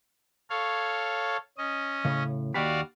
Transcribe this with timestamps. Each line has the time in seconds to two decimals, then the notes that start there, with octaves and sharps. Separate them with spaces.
0.50 A4 C#5 F5
1.58 C#4 D#5
2.05 A2 C#3
2.54 D#2 F#4 D5 F5 G5 B5